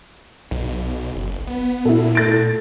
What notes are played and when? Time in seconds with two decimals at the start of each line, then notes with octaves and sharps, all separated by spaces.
0.51 B1
1.15 F#1
1.47 B3
1.85 A#2 E4 A4
2.15 A3 A6 D7